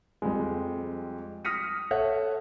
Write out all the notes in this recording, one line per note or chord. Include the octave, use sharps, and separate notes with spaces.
F2 G3 G#3
D#6 F6 A#6 B6 C#7 D#7
A4 C#5 E5 F#5